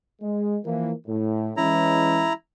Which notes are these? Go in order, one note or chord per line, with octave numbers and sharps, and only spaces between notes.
G#3
E3 F3 A#3
A2
E3 G#3 C#4 E4 A#5